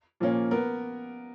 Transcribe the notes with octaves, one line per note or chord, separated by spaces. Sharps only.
A#2 F3 A#3 C#4
B3 A#4